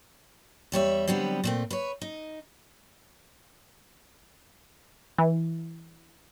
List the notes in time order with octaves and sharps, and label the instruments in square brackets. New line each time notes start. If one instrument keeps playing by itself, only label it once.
[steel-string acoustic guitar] E2 G3 C#5 E5
D3 F#3 G3 B3 C4
A#2 A3 C4
B4 C#5
D#4
[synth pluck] E3